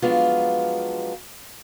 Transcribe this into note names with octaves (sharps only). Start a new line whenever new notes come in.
F3 F#3 G#3 B3 D4 F4